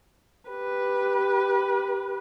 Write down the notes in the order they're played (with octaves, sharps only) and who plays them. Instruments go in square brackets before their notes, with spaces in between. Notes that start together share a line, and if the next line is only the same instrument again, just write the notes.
[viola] G4 B4